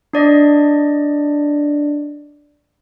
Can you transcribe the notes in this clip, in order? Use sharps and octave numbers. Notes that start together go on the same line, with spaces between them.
D4 D5 D#5